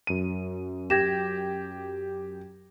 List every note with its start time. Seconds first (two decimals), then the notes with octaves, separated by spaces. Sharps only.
0.07 F#2 D#7
0.90 G4 G#6 A#6 E7